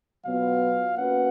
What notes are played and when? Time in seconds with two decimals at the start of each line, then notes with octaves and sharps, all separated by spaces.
0.25 B2 F#3 B3 F4 F5
0.97 A#3 C#4 F#4 B4 F#5